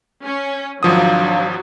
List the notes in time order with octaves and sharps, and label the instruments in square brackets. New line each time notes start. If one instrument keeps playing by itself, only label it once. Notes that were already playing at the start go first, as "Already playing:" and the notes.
[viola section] C#4
[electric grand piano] G#1 F3 D#6 [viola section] F#3 [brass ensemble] D4 F5